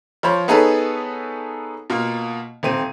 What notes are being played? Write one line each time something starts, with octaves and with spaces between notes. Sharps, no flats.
F3 C5 C#5 B5
B3 D#4 G#4 A4 B4 C#5
B2 A#3 F4
D#1 C4 D#7